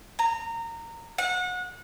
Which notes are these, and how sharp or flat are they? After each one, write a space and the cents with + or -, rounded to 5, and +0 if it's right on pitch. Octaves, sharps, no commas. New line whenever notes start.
A#5 -20
F#5 -30